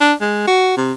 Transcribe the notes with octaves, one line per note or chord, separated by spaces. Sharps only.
D4
G#3
F#4
C3